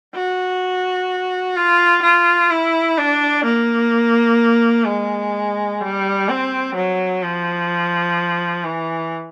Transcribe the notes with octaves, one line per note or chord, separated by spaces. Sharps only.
F#4
F4
F4
E4
D4
A#3
G#3
G3
C4
F#3
F3
E3